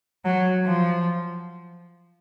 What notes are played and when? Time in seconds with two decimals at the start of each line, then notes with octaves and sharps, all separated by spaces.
0.25 F#3
0.66 F3